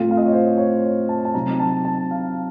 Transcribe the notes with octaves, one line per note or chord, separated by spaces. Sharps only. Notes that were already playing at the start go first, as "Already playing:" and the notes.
Already playing: A2 A3 C4 F4
F5
D#5
C#5
C5
C#5
C#5
A5
A5
C3 F#3 C4 D#4 A#5
A5
A5
F5